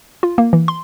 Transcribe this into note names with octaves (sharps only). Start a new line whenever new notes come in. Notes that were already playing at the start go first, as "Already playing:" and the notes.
F4
A#3
E3
C6